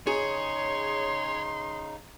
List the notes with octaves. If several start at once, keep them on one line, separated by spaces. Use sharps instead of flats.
C#3 D#4 G#4 C#5 C6